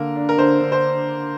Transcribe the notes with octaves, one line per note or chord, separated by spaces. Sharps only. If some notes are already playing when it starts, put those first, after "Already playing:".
Already playing: D3 A#3 A#4
D4
A#4
D3 C5
D3
C5